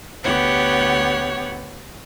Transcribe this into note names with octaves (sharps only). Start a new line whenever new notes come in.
D2 B3 G4 C#5 F#5